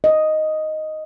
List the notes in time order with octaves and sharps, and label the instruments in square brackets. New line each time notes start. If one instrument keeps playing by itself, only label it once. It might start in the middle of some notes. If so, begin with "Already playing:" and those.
[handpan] D#5